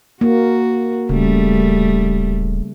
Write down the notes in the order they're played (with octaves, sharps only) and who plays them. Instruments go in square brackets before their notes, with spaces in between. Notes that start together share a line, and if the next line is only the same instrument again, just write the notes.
[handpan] A#3 [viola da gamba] F#4
[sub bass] D1 [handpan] C#3 [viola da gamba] G3 A3